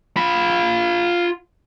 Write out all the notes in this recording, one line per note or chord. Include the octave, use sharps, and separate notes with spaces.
F4 B5